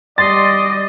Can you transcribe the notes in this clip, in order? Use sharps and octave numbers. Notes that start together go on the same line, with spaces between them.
G3 D5 D#5 C6 A6